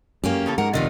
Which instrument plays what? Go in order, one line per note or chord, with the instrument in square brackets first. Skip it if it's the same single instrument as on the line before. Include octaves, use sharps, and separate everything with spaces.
[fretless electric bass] F#2 [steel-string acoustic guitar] A#3 C#4 G4
[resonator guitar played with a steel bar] C#3 E3 A4
[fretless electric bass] G#2 G#3 [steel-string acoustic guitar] A#4 [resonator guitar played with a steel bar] F#5
[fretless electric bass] F1 A#1 [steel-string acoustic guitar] C3 D#3 F4 [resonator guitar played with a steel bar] B4 D5 D#5